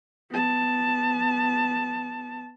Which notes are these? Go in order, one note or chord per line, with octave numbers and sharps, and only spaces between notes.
B3 A5